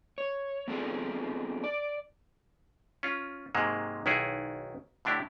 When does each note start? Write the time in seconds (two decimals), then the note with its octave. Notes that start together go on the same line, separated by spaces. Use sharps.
0.18 C#5
0.68 B3 C4 D4 F4 G#4 A4
1.64 D5
3.03 C#4 F4
3.55 G#2 C3 F#3 G#3 A#3
4.06 B1 D#3 E4 F#4 G#4
5.05 A2 D3 D4 E4 G4